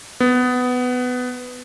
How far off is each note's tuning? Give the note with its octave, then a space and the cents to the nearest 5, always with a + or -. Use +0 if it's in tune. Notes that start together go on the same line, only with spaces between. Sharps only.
B3 +15